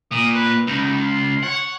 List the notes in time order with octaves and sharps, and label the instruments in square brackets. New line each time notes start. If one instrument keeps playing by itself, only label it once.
[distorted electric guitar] A#2 [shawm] D#6
[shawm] B4
[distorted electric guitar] C#2 [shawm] D#4
[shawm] F4
[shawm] C#5 [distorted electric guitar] F#5